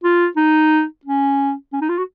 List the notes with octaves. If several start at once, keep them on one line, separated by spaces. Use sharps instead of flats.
F4
D#4
C#4
C#4
D#4
F4
F#4